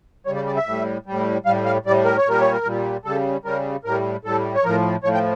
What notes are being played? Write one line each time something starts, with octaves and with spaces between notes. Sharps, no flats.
C#3 G3 C#5
D5
D5
E5
A2 G3
A2 G3
A2 G3 F5
F5
A2 G3 D5
A#4
C#5
A#2 G3 A#4
C#5
A#4
A#2 G3
C#3 G3 A4
C#3 G3 A#4
A2 G3 A#4
A2 G3 A4
C#5
A2 F3 A#4
A2 F3 C#5
G5